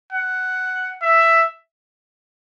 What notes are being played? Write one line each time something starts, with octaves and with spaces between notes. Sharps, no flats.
F#5
E5